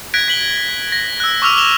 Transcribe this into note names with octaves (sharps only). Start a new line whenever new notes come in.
F#6 G#6 A#6 B6 D7
B6 F#7 G7
A#6
E6 F#6
C#6 D6 E6 F6 F7
E7 F7 G7